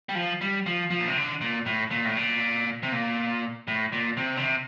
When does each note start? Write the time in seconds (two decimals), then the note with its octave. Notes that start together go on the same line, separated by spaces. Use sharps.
0.09 G3
0.15 F3
0.41 G3
0.66 F3
0.90 F3
1.00 A#2
1.08 C3
1.17 D3
1.41 A#2
1.66 A2
1.91 A#2
2.05 A2
2.17 A#2
2.83 C3
2.92 A#2
3.67 A2
3.92 A#2
4.17 C3
4.37 D3
4.42 C3